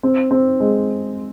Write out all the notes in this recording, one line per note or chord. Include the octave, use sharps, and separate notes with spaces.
C4
C4
G#3